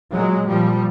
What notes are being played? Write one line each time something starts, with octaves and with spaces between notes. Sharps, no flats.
A#2 F#3 G#3
A#2 F3 G3